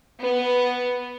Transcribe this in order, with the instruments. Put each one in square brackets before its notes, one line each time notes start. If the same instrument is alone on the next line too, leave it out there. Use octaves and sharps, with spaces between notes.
[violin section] B3